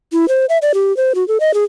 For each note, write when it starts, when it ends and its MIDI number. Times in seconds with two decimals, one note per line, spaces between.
0.13 0.26 64
0.29 0.45 72
0.49 0.58 76
0.62 0.72 74
0.74 0.95 67
0.97 1.13 72
1.15 1.26 66
1.28 1.38 69
1.40 1.54 75
1.54 1.64 68